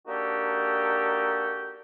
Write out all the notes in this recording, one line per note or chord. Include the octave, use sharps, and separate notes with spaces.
A#3 D4 D#4 F#4 G4 A4